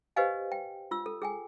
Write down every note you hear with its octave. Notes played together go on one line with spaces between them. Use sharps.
G4 B4 C5 D#5 F5 G#5
G5
F4 E6
A4
G#4 G5 G#5